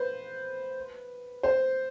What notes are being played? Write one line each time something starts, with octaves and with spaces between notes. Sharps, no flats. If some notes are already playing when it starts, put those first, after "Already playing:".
Already playing: B4 C5
C5